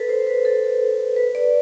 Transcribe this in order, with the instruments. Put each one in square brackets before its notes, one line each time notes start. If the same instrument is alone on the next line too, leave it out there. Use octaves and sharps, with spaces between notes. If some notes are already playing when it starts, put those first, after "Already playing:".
Already playing: [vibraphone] A4 B4
C5
B4
A4
B4
D5